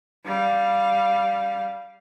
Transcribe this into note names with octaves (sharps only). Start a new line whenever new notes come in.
G3 F5